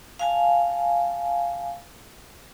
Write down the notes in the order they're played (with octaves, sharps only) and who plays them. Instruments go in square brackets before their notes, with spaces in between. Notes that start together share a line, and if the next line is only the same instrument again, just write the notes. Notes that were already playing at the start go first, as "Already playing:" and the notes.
[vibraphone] F5 G#5 A5